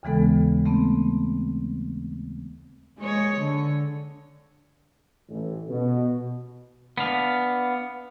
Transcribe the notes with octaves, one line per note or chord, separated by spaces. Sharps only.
D#2 C#3 E3 G#3 B3 A4
A3 B3 C4
G#3 C#5
D3
A1
B2
B3 D4 F5